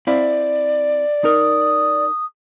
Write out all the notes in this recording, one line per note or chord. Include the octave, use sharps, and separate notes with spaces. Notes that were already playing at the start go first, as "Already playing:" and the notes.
C4 E4 D5 F5
D#4 A#4 D#6